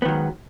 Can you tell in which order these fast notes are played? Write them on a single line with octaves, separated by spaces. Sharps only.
B3 D#3 F#3 G#2